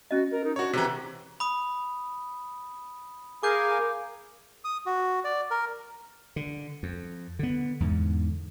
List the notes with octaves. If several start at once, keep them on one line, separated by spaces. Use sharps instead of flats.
C#4 F#4 D#5
A#4
D#4
D4 F#4 C#5
C3 E3 E4 G#4
B5 D#6
G#4 A#4 F5 G#5 D6 G6
D#6
F#4
D5
A#4
D3
F2
D3 B3
E2 G#2 D3